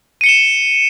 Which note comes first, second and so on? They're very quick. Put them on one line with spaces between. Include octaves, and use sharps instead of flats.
D#7 C#7 G7 E7